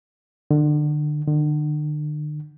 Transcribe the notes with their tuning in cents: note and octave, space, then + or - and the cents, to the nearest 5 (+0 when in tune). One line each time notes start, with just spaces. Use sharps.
D3 +30
D3 +40